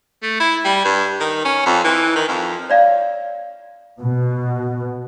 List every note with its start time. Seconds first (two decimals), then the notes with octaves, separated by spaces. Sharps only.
0.22 A3
0.40 E4
0.65 G3
0.85 G2
1.20 D#3
1.45 C#4
1.66 F2
1.84 E3
2.15 D#3
2.28 F2
2.70 C#5 D5 F5
4.00 B2